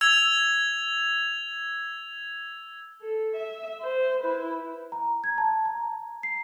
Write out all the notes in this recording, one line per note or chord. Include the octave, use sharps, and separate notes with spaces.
E6 G#6 F7
A4
E5
C5
E4 B4
A#5
G#6
A5
A#5
C7